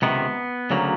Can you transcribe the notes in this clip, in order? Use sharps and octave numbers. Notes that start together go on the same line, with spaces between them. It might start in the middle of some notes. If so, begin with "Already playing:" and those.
C#2 C3 D#3 B3
D2 C#3 F#3 A#3